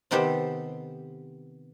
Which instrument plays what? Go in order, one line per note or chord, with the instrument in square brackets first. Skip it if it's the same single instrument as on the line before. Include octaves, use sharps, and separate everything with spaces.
[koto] C3 D#3 B3 G4 A4 C5